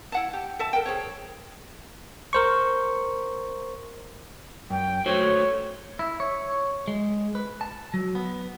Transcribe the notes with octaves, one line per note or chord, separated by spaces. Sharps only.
E4 F#5 A5
G4
A4 E5 A5
A#4 G5
G#4 C5 C#5
A#4 C5 C#6
F#2 G5
A3 F#4 C5 C#5
E4
C#5
G#3
B4
A5
F#3
B3